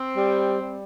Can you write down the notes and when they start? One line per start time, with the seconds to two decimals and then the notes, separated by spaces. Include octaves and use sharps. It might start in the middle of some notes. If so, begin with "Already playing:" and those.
Already playing: C4
0.17 G3
0.61 G3